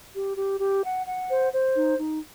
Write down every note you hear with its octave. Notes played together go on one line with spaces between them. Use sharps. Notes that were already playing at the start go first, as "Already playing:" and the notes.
G4
G4
G4
F#5
F#5
C5
C5
D#4
D#4